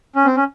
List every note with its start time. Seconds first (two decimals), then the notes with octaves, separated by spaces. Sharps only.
0.16 C#4
0.25 C4
0.37 C#4